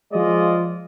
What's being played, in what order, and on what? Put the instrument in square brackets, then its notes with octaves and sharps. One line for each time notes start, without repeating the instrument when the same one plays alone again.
[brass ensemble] F3 G#3 F4 D5 D#5